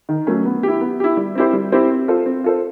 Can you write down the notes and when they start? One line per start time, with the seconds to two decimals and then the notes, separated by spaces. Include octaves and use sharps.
0.09 D#3
0.27 F#3 A3 C#4
0.45 B3
0.63 E4 G4
0.81 B3
1.00 E4 G4
1.17 G3
1.35 C4 E4 G4 C5
1.53 G3
1.72 C4 E4 G4 C5
1.90 C4
2.08 F4 A4 C5
2.26 C4
2.44 F4 A4 C5